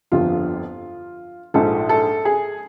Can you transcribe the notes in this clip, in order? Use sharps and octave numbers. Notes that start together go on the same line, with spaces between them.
G1 F2 D3 F3 F4
A#1 G#2 F3 A4
A4
G#4